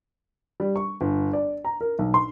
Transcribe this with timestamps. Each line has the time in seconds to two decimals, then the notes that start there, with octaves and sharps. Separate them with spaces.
0.60 G3
0.76 C#6
1.01 G1
1.33 D5
1.65 A#5
1.81 A#4
1.99 B1
2.14 C6